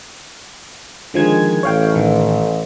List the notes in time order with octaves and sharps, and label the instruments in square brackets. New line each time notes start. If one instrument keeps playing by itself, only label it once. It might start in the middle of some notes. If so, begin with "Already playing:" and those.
[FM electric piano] D3 F3 G#6 [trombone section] D#3 G#3
[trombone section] A1 [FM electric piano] C#5 F5 G5
[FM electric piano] A2 D#3